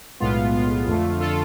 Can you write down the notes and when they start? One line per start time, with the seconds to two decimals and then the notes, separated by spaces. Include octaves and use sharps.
0.20 B1 A2 G#3 B3 F4
0.53 F4
0.87 F2 D3 A3
1.20 F4 A4